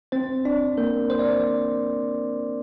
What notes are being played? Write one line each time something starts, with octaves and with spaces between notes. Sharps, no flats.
C4 C5
D4 D5
A#3 A#4
C5
D5